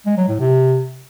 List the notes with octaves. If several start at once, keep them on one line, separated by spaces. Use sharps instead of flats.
G#3
F#3
A2
C3